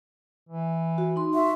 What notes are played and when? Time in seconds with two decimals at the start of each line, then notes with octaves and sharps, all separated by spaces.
0.49 E3
0.98 F#4
1.16 D#4 C6
1.34 F#4 E5